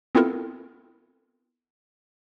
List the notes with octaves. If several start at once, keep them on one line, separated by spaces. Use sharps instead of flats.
B3 C4 E4 F4 A4 A#4